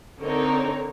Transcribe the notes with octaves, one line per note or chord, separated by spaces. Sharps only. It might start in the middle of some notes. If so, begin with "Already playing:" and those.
D3 C4 D#4 A#4 C#5